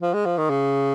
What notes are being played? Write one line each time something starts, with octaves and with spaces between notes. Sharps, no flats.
F3
G#3
F3
D#3
C#3